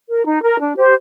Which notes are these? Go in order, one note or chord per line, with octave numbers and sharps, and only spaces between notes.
A#4
D#4
A#4
D4
G4 C5